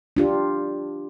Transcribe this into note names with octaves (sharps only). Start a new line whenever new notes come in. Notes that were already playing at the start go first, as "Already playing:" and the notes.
D4 F4 G4